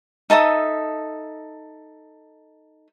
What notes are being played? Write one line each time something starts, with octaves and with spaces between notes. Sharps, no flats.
D#4 A4 E5 D#6